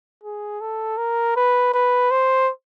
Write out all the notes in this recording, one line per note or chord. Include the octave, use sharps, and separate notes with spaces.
G#4
A4
A#4
B4
B4
C5